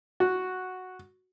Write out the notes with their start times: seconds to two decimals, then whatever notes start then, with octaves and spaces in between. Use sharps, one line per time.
0.20 F#4